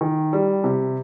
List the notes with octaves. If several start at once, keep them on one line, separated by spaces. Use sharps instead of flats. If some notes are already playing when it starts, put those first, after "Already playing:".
D#3
G3
C3